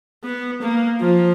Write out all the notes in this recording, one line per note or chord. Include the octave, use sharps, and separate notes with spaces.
B3
A#3
F3